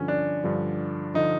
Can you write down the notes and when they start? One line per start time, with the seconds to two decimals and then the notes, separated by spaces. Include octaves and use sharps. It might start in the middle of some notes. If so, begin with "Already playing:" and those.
Already playing: G2 D3 F3 C#4
0.08 D4
0.44 G2 D3 F3
1.14 D3 F3 D#4